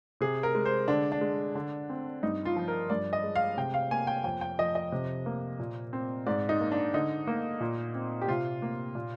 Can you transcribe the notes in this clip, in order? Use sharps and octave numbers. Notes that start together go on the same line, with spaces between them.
C3 G#4
A#4
G#3
C5
D3 D4
D4
G#3
D3
C4
G2 D#4
F4
F3
A#4
G2 D5
D#5
G#3
F5
C3 G5
F5
A#3 G#5
G5
F2 G5
G5
F3 D#5
D#5
C3
A#3
A#2
C4
G#2 D5
D#4
A#3
D4
D3 D#4
A#3
A#2
C4
G4
C3 F4
A#3
A#2